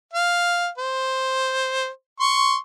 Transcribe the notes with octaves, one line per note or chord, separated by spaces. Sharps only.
F5
C5
C6 C#6